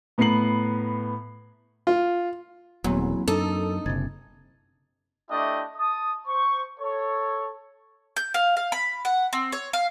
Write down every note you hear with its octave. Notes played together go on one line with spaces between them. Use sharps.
A2 B3 B4 A#5 C7 F#7
F4
D#1 E2 F#3 A#3 C4
F#2 D4 D#4 A4
F#1 C3 G#6 A6
A3 D4 E4 G4 D#5
A5 D#6
C5 C#6
A4 C#5
G6
F5
F5
B5
F#5
C4
C#5
F5